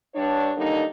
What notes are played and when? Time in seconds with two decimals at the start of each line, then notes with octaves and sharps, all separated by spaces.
0.15 G2 D4 C#5
0.57 D3 G3 A#3 D#4